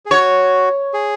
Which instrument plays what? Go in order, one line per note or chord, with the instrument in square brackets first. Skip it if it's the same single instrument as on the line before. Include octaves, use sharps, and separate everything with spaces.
[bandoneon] G#4
[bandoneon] F#4 [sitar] C#5
[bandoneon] G#4